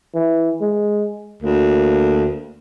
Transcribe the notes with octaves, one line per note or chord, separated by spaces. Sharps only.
E3
G#3
D2 A#3